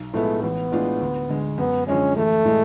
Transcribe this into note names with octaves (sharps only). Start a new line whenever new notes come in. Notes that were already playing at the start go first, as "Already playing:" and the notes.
Already playing: B1
A2 F3 G#3 A3 B3
A1 B3
A2 G#3 D4 F4
D2
D3 G#3
F#2 B3
D3 F3 G#3 C#4
A1 A3
A2 G#3